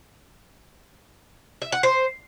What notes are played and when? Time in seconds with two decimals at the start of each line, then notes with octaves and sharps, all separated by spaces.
1.62 E5
1.72 F#5
1.83 C5